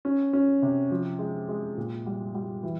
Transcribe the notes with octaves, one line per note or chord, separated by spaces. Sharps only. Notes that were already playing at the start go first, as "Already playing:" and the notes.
C#4
C#4
C3
F3
G#3
G#3
A#2
G3
G3
E3